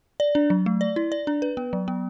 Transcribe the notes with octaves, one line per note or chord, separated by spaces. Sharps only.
D5
D4
F#3
A3
D5
E4
D5
D4
B4
B3
F#3
B3